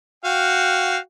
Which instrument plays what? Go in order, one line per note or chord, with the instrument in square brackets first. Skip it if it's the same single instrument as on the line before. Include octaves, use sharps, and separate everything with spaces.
[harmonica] F#4 F5 G5